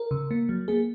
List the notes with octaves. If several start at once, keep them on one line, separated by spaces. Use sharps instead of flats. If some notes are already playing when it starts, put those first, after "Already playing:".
Already playing: A#4
C#3
A#3
F#3
A#3 G#4